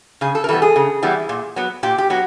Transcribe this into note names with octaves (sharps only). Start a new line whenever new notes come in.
C#3 G#4
A4
A#4
E3 G3 B3 A4
G#4
C#3
E3 G3 B3
A#2
F#3 B3
A#2 G4
G4
F#3 B3 F#4